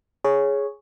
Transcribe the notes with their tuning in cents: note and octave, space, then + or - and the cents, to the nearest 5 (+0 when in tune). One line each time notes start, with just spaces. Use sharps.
G#4 +0 C#5 +0